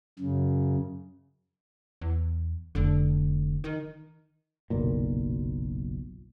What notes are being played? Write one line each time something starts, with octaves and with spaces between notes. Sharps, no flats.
F#2 C#3
E2
F1 D3
D#3
F#1 B1 A#2